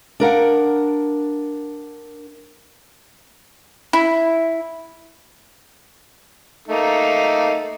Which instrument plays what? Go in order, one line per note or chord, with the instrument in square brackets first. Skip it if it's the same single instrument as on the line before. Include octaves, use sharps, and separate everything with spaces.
[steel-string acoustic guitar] D4 A#4 F5 F#5
[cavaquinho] E4
[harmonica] A3 A#3 D#4